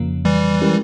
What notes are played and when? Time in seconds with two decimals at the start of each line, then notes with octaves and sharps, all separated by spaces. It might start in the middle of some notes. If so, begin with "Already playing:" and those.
Already playing: F2 C#3 F3 A#3
0.25 E3 G3
0.61 G#3 C#4 E4 G4 A#4